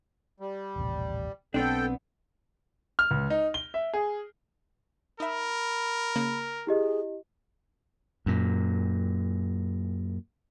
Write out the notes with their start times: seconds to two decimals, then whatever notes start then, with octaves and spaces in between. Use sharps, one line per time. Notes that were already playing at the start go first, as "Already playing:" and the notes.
0.40 G3
0.76 D#1 A1 C3
1.54 B1 B3 C4 D4 A4 G5
2.99 F6
3.11 C#2
3.30 D#4
3.54 G7
3.74 E5
3.93 G#4
5.20 D#4 A#4 E5 B5
6.16 C#3 A#3 A#6
6.67 E4 G4 G#4 D#5
8.26 F#2 A#2